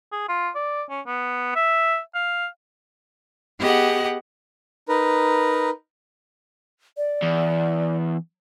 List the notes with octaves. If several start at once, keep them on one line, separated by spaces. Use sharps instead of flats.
G#4
F4
D5
C#4
B3
E5
F5
B3 G4 G#4 D#5 F#5
D#4 A#4 B4
D5
E2